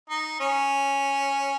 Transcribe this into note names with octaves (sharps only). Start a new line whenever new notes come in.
D#4
C#4